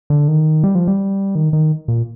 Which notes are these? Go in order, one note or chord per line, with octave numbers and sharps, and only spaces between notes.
D3
D#3
G3
F3
G3
D#3
D#3
A#2